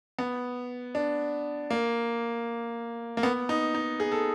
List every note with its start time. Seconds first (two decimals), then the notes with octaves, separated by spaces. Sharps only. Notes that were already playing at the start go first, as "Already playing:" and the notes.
0.19 B3
0.95 D4
1.70 A#3
3.17 A#3
3.23 B3
3.49 D#4
3.74 D#4
4.00 G#4
4.12 A4